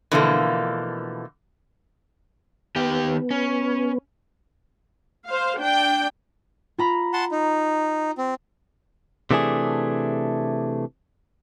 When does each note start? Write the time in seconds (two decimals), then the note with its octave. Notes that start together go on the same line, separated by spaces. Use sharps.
0.12 B2 D3 E3 F3 A3 A#3
2.76 D#3 B3 G4 G5
3.31 C#4
5.27 C5 F5
5.59 D4 G5
6.78 F4 A#5 B5
7.13 F#5 A5 C6
7.31 D#4
8.18 C4
9.31 C3 E3 A3 D4 G#4